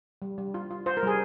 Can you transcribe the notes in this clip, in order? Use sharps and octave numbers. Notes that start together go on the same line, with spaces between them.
G3
G3
F4
F4
F4 C5
A#4
G3 G#4